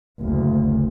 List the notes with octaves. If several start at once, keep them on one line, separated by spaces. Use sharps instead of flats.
F#1 D2